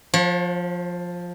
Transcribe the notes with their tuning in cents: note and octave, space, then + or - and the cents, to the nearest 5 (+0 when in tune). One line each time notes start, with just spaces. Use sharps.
F3 +10 C#5 -40 F#5 -25